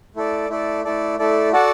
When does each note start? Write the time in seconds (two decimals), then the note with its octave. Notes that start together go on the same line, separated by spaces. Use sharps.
0.15 A3 E4 A4 D5
0.49 A3 E4 A4 D5
0.85 A3 E4 A4 D5
1.19 A3 E4 A4 D5
1.52 F#4 A4 D5 F#5 A5